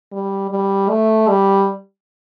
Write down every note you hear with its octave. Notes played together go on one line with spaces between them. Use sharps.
G3
G3
A3
G3